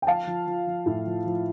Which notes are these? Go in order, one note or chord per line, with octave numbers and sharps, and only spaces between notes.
G5
F3 F5 A5
F3
F3
F3
A2
F3
F3